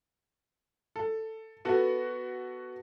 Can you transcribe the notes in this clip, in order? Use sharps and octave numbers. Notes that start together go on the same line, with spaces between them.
A4
B3 F#4 A4